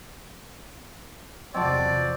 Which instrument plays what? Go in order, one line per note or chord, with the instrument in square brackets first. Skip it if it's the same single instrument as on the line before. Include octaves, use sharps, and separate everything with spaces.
[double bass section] E2 C3 F3 [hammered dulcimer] C4 F#4 [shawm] D5 [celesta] D#5 A5